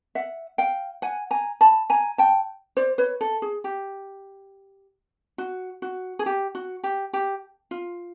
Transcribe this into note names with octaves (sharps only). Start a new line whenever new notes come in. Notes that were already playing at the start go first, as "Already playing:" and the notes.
E5 F#5
F5 G5
F#5 G#5
G#5 A#5
A5 B5
G#5 A#5
G5 A5
C5 D5
B4 C#5
A4
G#4
G4
F#4
F#4
G#4
G4
F#4
G4
G4
F4